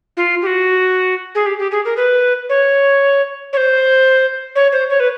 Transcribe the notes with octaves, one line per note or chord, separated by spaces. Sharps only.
F4
G4
F#4
G#4
G4
G4
G#4
A#4
B4
C#5
C#5
C5
C#5
C5
C#5
B4